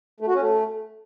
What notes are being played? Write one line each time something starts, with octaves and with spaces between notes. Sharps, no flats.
A3
F#4
C#4
A3